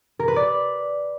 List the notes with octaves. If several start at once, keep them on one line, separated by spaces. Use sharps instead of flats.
A#4
B4
D5